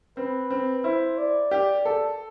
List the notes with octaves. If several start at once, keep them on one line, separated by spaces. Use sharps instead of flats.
C4 B4
C4
E4 C5
D5
G4
A4